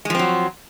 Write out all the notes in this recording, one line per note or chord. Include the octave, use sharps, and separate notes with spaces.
F3 F#3 G#3 C4